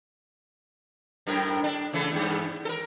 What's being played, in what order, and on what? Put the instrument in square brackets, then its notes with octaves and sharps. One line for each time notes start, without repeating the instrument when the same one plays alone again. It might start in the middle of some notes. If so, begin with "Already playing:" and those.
[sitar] F#2 A2 A#4
D4
C#3 E3 A3
E2 G2
A4 A#4